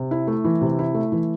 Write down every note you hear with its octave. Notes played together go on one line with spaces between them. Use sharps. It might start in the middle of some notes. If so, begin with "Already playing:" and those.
Already playing: C3
E4
A3
E3
C3
E4
A3
E3